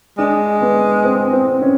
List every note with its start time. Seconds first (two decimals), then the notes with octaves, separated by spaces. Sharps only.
0.18 G#3 D4
0.61 B3
1.04 C4
1.33 C4
1.62 C#4